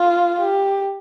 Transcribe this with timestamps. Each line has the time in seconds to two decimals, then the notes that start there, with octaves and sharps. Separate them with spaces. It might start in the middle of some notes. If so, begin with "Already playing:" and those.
Already playing: F4
0.38 G4